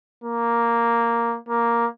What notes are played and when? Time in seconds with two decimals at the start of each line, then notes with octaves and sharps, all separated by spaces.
0.24 A#3
1.49 A#3